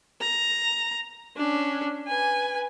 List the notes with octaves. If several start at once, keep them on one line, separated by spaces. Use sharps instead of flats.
A#5
C#4 D4
B4 G#5